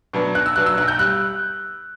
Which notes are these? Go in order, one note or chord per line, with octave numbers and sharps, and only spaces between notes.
B2 F#3 B3 D4
B1 F#6
E6
B2 F#3 B3 D4 F#6
E6
B1 F#6
G6
G3 F#6